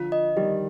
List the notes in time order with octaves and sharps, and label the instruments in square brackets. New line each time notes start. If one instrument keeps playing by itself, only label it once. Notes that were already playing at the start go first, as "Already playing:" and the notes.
Already playing: [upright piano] D3 F3 [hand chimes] F4
[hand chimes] D#5
[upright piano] D#3 G3 [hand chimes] G4